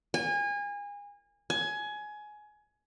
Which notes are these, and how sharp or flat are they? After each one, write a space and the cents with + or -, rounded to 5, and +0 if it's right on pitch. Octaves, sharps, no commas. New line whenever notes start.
G#5 -30
G#5 +20